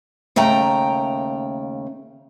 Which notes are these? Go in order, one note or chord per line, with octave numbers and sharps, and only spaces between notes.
D#2 C#3 A3 G5 A#5